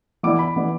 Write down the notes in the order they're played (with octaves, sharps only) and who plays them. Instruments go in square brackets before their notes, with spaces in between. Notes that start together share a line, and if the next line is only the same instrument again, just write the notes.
[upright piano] E3 B3 E4 D5 [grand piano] D6
[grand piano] B5
[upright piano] E3 B3 E4 D5